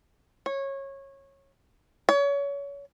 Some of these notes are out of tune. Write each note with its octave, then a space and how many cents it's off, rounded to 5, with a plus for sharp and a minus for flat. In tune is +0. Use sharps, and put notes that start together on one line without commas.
C#5 -20
C#5 +30